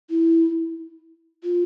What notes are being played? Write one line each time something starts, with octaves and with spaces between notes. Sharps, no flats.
E4
F4